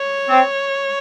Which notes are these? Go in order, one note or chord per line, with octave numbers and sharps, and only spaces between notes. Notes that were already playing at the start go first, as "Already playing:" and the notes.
Already playing: C#5
C4